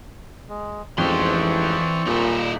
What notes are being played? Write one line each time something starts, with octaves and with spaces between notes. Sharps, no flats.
G#3
A1 F2 G#2 E3 C4 D5 C6 C#6
D#1 A#2 D#4 E4